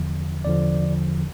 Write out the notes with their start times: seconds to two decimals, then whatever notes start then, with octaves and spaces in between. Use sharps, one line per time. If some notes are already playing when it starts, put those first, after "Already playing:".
Already playing: E2 D3 F3
0.45 E2 D3 F3 D5